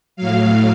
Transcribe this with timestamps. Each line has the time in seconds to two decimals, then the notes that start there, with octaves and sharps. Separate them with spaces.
0.16 A2 F#3 F5